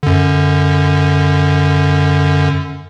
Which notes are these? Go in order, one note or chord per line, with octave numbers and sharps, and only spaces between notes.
F#2 D3